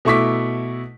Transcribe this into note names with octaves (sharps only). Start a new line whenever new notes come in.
B2 A3 E4 C#6 D6 B6